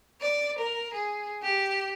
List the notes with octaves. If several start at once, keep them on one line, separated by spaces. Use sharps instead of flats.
D5
A#4
G#4
G4